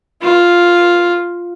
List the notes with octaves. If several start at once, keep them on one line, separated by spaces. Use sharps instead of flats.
F4